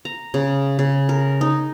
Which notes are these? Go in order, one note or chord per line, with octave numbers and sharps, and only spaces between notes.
A#5
C#3
C#3
A#4
D#4